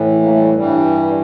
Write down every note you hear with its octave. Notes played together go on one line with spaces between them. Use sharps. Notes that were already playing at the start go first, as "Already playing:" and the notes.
Already playing: A2 E3
A#3
A3
G3
A3
G2 E3 G3